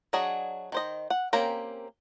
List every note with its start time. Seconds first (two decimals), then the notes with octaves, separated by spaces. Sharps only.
0.13 F#3 D4 F#4 G#4 D#5
0.72 D#3 C5 D#5
1.10 F#5
1.33 A#3 C4 C#4 G4 A#4